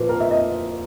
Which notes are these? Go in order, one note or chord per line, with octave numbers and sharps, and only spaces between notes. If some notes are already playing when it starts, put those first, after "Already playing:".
Already playing: A#2 F3 A#3 B4 C5
A#4
E5
D#5